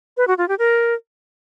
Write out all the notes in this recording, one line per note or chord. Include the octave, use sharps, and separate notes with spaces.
B4
F#4
F4
G4
A#4